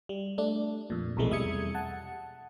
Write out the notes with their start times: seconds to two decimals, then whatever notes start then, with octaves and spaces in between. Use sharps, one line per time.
0.09 G3
0.38 A3 D4
0.90 F2 A#2
1.17 B1 F2 C3 E3 G#3 A3
1.30 E2 G3 E5 D#6 G#6 C#7
1.75 F#5 A5